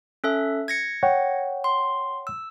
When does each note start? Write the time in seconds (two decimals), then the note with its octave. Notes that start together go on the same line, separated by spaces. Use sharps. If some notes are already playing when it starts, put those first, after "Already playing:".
0.24 C#4 A4 E5
0.68 G#6 A#6 C#7
1.03 C#5 F#5 G5
1.64 C6
2.27 E6